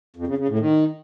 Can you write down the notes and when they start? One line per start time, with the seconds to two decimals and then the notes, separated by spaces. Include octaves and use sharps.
0.16 F2
0.27 C#3
0.38 C#3
0.48 A2
0.59 D#3